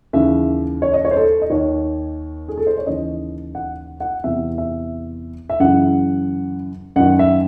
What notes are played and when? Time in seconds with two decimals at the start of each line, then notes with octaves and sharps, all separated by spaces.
0.13 D#2 C#3 E3 E5
0.82 C#5
0.93 D#5
1.05 C#5
1.11 C5
1.17 A4
1.42 D#5
1.50 D#2 D#3 C#5
2.48 G#4
2.58 A4
2.67 C5
2.78 C#5
2.86 D#2 C#3 E3 D#5
3.55 F#5
4.00 F#5
4.24 E2 C3 E3 E5
4.58 E5
5.49 E5
5.60 F#2 C#3 E3 F#5
6.96 F#2 D#3 F#5
7.19 E5